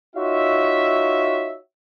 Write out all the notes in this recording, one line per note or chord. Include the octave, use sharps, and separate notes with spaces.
D#4 F4 F#4 C#5 E5